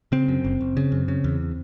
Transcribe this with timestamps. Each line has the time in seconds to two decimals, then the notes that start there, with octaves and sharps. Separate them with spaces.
0.12 C#3 C4
0.28 F#2
0.44 F#1
0.61 F#1
0.77 C#3
0.92 F#2
1.08 C#3
1.24 E2